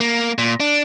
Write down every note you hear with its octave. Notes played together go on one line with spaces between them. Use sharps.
A#3
A#2
D4